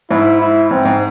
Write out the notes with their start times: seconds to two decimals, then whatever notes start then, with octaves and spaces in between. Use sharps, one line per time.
0.11 G#2 E4
0.41 E4
0.71 G#2 C4
0.85 G#2